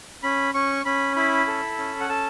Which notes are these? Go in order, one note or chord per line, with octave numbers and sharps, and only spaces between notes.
C#4 B5
C#4 C#6
C#4 B5
E4 B5
A4
C#4
F#5
A4 A5